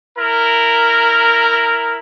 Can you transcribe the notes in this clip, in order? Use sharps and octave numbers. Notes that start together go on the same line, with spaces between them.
E4 A#4